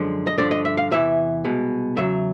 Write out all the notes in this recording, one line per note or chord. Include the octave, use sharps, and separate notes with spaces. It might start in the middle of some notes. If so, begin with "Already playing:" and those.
Already playing: F#2 D3 F3 G#3
D#5
G2 D3 F3 D5
D#5
E5
F5
E2 C3 E3 E5
C2 B2 G#3
E2 C#3 F#3 E5